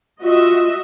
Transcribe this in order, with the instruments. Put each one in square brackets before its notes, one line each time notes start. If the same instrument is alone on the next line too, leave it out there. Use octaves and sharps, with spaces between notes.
[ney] F4 [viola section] F#4 D#5 E5